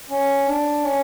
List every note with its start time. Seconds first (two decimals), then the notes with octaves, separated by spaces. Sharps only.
0.10 C#4
0.47 D4
0.83 C#4